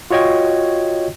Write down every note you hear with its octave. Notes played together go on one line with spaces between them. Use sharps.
F4 F#4 C#5 D#5 G5 G#6